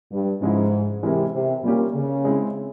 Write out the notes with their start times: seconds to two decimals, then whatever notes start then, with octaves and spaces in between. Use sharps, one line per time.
0.12 G2
0.42 G#2 C#3 F3 G#3 E4
1.03 C3 E3 G#3 E4 A#4
1.33 C3
1.63 A#2 G3 A#3 C#4 G4
1.95 C#3
2.25 G#3 C4 E4